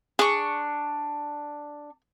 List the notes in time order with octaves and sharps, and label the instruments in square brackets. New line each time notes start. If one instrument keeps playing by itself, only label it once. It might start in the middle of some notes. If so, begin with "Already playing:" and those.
[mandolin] D4 C#6 [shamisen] G#4